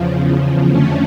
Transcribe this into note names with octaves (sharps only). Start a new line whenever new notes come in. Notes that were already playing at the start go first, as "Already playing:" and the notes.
Already playing: E2 C#3 F3
F2 D3 F3 A3 C#4